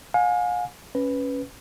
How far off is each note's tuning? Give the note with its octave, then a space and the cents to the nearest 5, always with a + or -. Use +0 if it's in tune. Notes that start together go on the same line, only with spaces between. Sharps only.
F5 +45 G#5 +0
C#4 +0 B4 +0